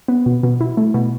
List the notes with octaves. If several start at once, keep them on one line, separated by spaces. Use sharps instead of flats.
B3
B2
B2
E4
A3
B2